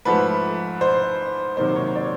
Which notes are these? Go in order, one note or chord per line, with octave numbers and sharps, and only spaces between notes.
G#2 F3 A3 B4
C5
C3 D#3 F#3 A#3 C5
C#5
D5